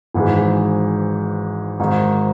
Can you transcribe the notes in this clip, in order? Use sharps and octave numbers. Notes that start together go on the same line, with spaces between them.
G#1 G#2 E3 G#3
G#1 G#2 D#3